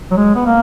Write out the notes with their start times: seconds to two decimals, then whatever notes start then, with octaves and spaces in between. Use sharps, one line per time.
0.11 F#3
0.17 G#3
0.35 B3
0.46 A#3